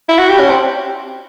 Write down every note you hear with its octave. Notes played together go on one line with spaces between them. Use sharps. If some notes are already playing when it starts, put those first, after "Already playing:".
E4
F#4
G4
C#4
C4